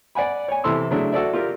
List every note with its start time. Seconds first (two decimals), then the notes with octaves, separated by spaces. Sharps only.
0.15 D5 F#5 G#5 B5
0.48 C#5 G#5
0.64 C3 E3 E4 A4 C6 E6
0.91 C#3 F#3 A3 D4 E4
1.12 F#4 A4 D5 E5
1.33 F4 G4 A#4